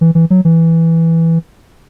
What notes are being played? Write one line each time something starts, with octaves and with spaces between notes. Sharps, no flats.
E3
E3
F#3
E3